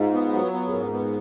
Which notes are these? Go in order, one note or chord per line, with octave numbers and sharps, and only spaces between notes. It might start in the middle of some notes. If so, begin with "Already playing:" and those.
Already playing: G#2 D#4 F4
B3
F#3
B3
G#4
G#2 A#4
G#4
B3
A#4